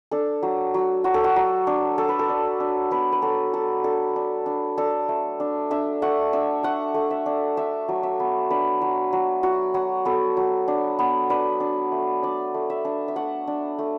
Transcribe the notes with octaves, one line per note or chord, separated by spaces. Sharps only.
D4 A4
F#3
F#3
F#3 F#4
A4
F#4
F#3
D4
F#3 A4
B4
A4
D4
D4
B3 B4
B4
F#3 A4
F#3 A4
D4 A4
D4
D4
D4 A4
A3
D4
D4 E5
A3 F#5
D4 E5
A3 F#5
A3
E5
D4
D4 E5
F#3
E5
B3
D4 B4
F#3
F#3
F#3 F#4
F#3 F#4
B3 A4
F#3
D4
B3
D4 B4
D4
A3
D4 D5
A3
E5
D4
E5
A3 F#5
D4
A3